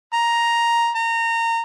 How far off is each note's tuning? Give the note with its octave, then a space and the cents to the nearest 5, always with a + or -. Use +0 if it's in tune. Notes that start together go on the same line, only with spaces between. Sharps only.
A#5 +5
A#5 -25